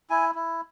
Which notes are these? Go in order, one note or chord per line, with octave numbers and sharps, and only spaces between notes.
E4 G#5
E4